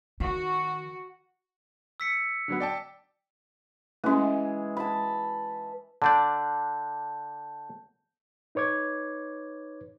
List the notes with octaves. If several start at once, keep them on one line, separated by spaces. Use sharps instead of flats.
D#3 F#4
E6 B6 C#7
D3 F#3 B3
D5 G5 A5
E3 G#3 A3 C#4
A5 B5
D3 D4 D5 A5 G6
D#4 B4 C#5 D6 G#6